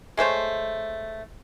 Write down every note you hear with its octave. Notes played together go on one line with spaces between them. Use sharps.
G#3 A3 C5 C#5